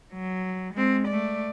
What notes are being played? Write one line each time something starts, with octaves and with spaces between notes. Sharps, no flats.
F#3
G#3 C4
A3 D5